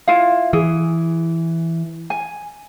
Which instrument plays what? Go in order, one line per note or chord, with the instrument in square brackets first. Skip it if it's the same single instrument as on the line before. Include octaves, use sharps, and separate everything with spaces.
[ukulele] E4 F4 F5
[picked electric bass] E3 [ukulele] G#4
[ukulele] G#5